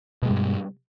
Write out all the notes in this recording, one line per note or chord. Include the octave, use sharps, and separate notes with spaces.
G2 B2 G3 G#3